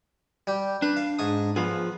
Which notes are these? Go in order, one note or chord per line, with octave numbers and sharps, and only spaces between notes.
G3 G4
D4 B4
F5
G#2 C#6 D#6
F3 B3 F4 G#4